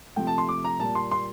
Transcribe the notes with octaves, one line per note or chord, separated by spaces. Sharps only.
C3 F3 A3 G5
A5
C6
D6
A#5
A#2 G3 A#3 A5
C6
C6